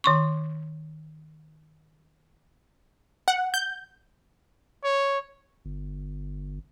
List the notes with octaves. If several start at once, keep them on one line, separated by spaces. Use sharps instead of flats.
D#3 C6 C#6
F#5
G6
C#5
G1